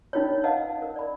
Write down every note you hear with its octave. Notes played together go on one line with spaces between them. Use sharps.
C#4 D#4 F4 A#4 C#5
B4 D#5 F5 F#5 A5
A#4
D5 B5